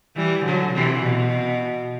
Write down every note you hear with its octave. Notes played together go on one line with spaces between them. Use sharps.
E3 G3
D3 F#3
C3 E3
B2